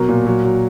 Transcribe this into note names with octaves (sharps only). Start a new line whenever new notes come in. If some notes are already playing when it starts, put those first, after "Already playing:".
Already playing: B2 F#3 A#4
A#2
F#3
F#3